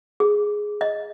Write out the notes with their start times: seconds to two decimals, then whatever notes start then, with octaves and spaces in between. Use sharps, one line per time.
0.20 G#4
0.81 D#5